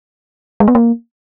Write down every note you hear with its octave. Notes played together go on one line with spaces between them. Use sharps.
G#3
B3
A#3